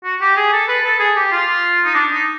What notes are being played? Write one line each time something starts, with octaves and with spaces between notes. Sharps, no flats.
F#4
G4
G#4
A4
B4
A4
G#4
G4
F4
D#4
D4
D#4